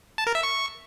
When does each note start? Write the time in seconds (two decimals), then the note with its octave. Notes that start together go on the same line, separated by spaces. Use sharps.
0.18 A5
0.27 A#4
0.35 E5
0.43 C#6